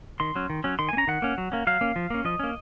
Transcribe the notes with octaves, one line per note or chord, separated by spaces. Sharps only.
D#3 C6
F#3 C#4
D#3
F#3 C#4
D#3 C6
A#3 G#5
C#4 A#5
D#3 F#5
A#3 C#4
F#3
A#3 C#4
F#3 F5
A#3 C#4
F3
A#3 C#4
F3 D#5
A#3 C#4